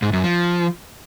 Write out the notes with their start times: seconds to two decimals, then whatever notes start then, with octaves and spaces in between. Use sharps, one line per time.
0.02 G#2
0.13 F#2
0.24 F3